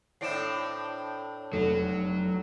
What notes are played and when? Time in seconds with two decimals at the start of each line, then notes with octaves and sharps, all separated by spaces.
0.21 A2 C4 D4 C7 D7 E7
1.53 F1 F#3 A4